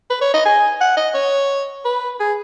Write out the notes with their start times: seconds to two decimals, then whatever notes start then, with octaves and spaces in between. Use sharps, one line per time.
0.10 B4
0.21 C#5
0.34 D#5
0.45 G#5
0.81 F#5
0.97 D#5
1.14 C#5
1.85 B4
2.20 G#4